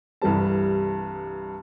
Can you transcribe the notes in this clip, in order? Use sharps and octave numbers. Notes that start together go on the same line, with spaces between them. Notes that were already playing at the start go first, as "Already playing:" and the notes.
C2 G2 E3 G3 A4 A5